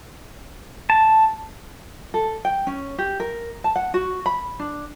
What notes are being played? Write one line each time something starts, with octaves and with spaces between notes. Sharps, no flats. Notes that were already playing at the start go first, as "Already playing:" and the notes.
A5
A4
G5
C#4
G4
A#4
A5
F#5
F#4
B5
D4